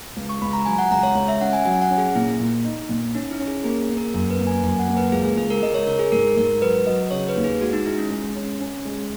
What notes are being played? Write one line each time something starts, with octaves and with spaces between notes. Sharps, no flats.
C#2
C#6
C#2 B5
A#5
F#3 G#5
F#5
C#2 A#5
C#5
C#2 C#5
E5
C#4 F#5
G#5
F#3 G#5
F#5
C#4
G#4
A#2 E4
A#2
D#4
A#2
C#4 D#4
E4
C#4
G#4
A#3 G#4
G#4
A#3
A#4
F#2 A#4
B4
A#3
G#5
F#2 G#5
F#5
A#3
B4
C#2 G#4
G#4
C#2 G#4
A#4
C#2 D#5
C#5
C#3 A#4
G#4
G#2 A#4
G#2 A#4
F#3 B4
F#3 D#5
C#3 C#5
B4
D#2
G#4
G#3 F#4
D#4
G#3 E4
C#4
G#3
C#4
C#4
G#3